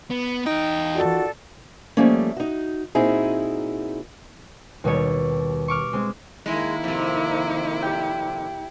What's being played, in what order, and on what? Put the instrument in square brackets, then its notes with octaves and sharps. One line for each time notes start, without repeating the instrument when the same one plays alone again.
[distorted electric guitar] B3
[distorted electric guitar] E2 G5 [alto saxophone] D#4
[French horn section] D#3 F4 F#4 [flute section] A4 D5
[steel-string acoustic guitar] F3 G3 A3 A#3 C#4
D#4 F#4
A#2 C4 D#4 E4 F#4 G#4
[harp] D#2 B2 G3 C#5
C#6 D6 F6
G#3 C4
[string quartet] D#3 A#3 [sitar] G#3 [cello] E4
[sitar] F2 C3
[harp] G4 D5 G5